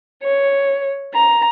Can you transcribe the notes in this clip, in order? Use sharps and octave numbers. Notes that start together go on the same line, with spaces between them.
C#5
A#5